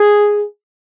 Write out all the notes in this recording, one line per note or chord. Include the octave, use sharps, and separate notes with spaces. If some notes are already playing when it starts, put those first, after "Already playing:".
Already playing: G#4